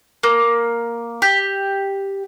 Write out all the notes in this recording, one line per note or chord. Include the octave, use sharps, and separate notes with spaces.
A#3
G4